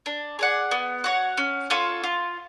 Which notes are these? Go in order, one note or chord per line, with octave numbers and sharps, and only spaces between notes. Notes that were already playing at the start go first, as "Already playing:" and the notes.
D4
G#4 D5 F#5
B3
F#4 C#5 F#5
C#4
F4 A4 C#5
F4